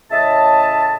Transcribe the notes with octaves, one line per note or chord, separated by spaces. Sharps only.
A2 C#3 D#5 E5 A5